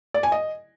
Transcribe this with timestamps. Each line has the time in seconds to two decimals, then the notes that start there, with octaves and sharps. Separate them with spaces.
0.14 D5
0.23 G#5
0.32 D#5